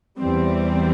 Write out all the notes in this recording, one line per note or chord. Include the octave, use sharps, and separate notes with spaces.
E2 E3 G3 C4